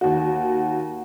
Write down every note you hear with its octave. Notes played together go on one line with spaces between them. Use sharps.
D#2 F#4